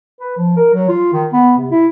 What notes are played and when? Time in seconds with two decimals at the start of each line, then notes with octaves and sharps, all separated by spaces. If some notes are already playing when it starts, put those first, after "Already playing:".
0.20 B4
0.37 F3
0.57 A#4
0.73 F#3
0.89 F4
1.13 D#3
1.33 B3
1.57 C3
1.71 E4